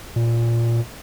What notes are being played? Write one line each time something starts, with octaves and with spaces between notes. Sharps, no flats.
A#2